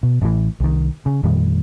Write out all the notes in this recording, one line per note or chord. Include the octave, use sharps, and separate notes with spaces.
B2
A1 A2 C#3 E3
C2 D#3
C#3
F2 A#2 D#3 G3